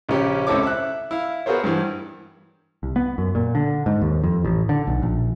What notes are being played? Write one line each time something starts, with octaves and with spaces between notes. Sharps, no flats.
A#1 C#3 F3 C#4 G4
C#2 C4 E4 A4 C#5 D6
E5 F#6
E4 F5
B3 F#4 G#4 A#4 C5 C#5
G2 E3
C2
B3
F#2
A#2
D3
G#2
D#2
F2
A1
D3
B1
A#1